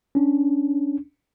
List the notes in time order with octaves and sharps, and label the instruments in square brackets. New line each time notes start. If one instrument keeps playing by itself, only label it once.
[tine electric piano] C#4 D4